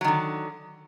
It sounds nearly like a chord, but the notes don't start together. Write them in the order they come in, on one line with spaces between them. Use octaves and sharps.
F#3 D#3 D3